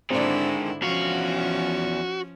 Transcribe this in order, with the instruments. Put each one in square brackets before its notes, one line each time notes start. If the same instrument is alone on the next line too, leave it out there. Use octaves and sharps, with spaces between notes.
[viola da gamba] G#2 D3 E4 [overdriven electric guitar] D#3 G#3 [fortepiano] C4 D4
[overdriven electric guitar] E2 F5 [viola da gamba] F3 C#4 [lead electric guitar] F#4